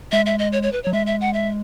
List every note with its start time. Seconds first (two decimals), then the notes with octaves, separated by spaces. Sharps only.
0.12 G#3 E5
0.26 E5
0.39 D#5
0.52 C#5
0.63 C#5
0.73 B4
0.83 C#5
0.87 F#3
0.93 G#3 E5
1.06 E5
1.21 F#5
1.34 E5